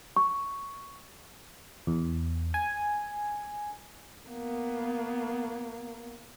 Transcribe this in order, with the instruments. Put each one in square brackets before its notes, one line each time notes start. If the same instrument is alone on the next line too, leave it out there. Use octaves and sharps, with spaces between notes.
[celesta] C#6
[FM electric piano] E2
G#5
[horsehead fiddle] A#3 B3